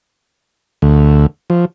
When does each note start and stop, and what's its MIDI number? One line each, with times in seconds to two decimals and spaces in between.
0.82 1.26 38
1.50 1.65 53